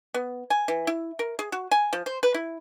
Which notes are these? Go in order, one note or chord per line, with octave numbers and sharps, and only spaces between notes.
B3
G#5
E3
E4
A#4
G#4
F#4
G#5
F3
C5
B4
E4